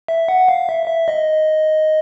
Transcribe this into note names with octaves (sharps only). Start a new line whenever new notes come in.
E5
F#5
F5
E5
E5
D#5